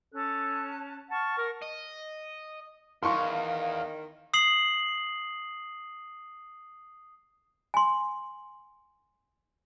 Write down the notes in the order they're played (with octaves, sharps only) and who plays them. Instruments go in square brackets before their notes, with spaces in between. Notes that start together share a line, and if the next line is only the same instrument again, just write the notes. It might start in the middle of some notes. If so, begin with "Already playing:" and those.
[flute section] C#4 A5 F#6 [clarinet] A4
[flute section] F#5 C#6 F6 [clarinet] A5
[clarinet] A#4
[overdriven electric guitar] D#5
[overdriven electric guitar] E2 [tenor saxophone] D#3 [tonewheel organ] F5 [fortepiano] C6 C#6
[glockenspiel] D#6 C7 F#7
[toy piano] G#5 C6